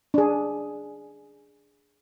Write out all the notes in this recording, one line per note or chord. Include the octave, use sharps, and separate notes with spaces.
D4 G#4